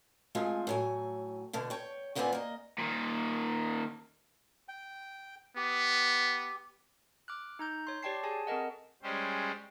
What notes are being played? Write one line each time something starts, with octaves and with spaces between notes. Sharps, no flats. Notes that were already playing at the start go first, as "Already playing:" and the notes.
G#3 A3 C4 F4 G#4
A2 F#3 G#5
B2 D3 A3
C#5 G5
D#2 A#2 B3 C4 D5 G#5
A#3 D#5
A#2 D#3
G5
B3 G4
D6 F6 F#6
D#4 A#5 G6
C#5 C6
G4 C#5 D5 G5 A5 C7
G#4 G#5 A5
C4 A4 A#4 D#5 F#5
G3 G#3 C#4 G4 C5